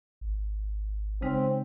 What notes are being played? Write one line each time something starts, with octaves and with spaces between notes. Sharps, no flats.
G#1
C#3 G#3 C4 D#4